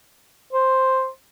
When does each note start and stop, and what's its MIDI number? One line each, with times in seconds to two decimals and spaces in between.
0.53 1.09 72